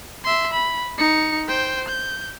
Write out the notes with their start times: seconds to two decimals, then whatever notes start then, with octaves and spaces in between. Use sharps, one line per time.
0.24 E5 C6
0.53 B5
0.98 D#4 C#7
1.48 C5 G5
1.88 G6